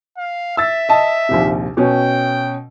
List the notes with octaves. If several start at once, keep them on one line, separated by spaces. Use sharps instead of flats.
F5
E5 E6 A6
D#5 A5
A#1 D#2 C3
B2 C#4 G5